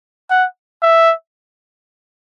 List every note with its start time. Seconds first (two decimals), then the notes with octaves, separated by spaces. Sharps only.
0.30 F#5
0.82 E5